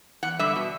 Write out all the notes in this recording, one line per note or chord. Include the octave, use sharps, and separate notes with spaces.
E2 F#5
D3 G3 E5
B2